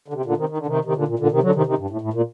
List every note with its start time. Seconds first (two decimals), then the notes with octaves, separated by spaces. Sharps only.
0.08 D3
0.14 C3
0.25 A#2 D3
0.37 C3 D#3
0.49 D#3
0.58 D3
0.66 C3 D#3
0.85 C3 D#3
0.96 A#2 D3
1.08 A#2
1.19 A#2 D3
1.31 C3 D#3
1.43 D3 F#3
1.55 C3 D#3
1.66 C3 D#3
1.78 G2
1.90 A2
2.01 A2
2.13 A#2